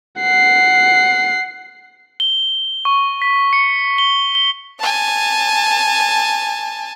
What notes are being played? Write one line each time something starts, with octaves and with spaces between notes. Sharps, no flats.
F#5 C7
G7
C#6
B6
C#7
G7
G7
G#5 A5